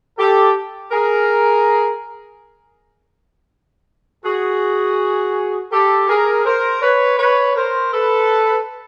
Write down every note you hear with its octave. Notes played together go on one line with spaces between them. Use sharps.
G4 A4
G#4 A#4
F#4 G#4
G4 A4
G#4 A#4
A#4 C5
B4 C#5
B4 C#5
A#4 C5
A4 B4